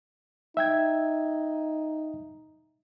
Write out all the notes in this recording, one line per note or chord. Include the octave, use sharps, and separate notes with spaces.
D#4 E5 G5 G#6